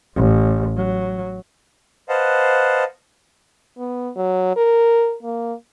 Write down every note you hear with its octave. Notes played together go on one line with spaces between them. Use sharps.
A1
F#3
B4 C5 D#5 F5 F#5 A5
B3
F#3
A#4
A#3